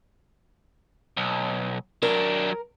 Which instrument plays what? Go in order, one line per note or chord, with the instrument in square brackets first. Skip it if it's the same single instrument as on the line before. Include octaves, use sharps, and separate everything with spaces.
[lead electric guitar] B1
[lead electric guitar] F#3 D4 [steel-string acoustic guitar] A#4